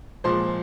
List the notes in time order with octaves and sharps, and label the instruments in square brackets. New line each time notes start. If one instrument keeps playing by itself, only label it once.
[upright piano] A#2 F3 G#3 C5 C6